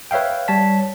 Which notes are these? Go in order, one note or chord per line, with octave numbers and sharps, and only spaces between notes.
B4 C#5 E5 F5 G5
G3 C#5 A5 B6